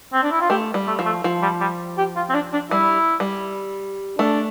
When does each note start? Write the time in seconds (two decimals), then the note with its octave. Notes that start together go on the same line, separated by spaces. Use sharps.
0.13 C4
0.23 D4
0.31 E4
0.41 F4
0.50 A3 G4
0.74 G3
0.87 A3
0.99 F3
1.06 A3
1.24 F3
1.42 G3
1.60 G3
1.98 G4
2.16 F4
2.29 C4
2.34 D4
2.53 D4
2.71 G3 E4
3.20 G3
4.19 A3 D4